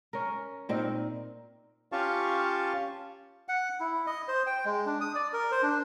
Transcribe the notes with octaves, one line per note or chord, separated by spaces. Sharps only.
C#4 A#4
A#2 C4 D#4 A#4
C#4 F4 G4 F5 A5 C#6
F#5
E4
D#5
C5
G5
G#3
D4
D#6
D5
A#4
C5
D4